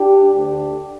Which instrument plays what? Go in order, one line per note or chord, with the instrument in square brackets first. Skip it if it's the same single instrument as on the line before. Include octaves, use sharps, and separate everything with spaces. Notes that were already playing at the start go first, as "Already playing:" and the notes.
Already playing: [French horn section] D4 G4
D2 D3 D4 G4